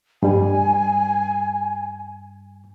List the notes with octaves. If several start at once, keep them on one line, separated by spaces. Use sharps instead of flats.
G2 G3 G#5